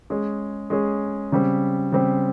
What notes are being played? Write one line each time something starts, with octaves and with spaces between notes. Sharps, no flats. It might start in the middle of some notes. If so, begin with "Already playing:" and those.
G#3 C#4 G#4
G#3 C#4 G#4
C#3 G3 C4
C#3 G3 C4